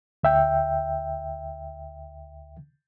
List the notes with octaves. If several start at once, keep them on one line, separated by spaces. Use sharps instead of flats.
D2 E5 G5